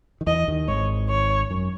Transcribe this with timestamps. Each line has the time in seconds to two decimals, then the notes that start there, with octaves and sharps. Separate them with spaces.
0.21 D#3
0.27 E2 E3 D#5
0.48 D#2 D#3
0.68 G#1 G#2 C#5
1.09 C#5
1.51 F#2